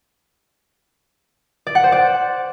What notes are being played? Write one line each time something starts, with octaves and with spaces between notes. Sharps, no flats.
D5
F#5
C5
D5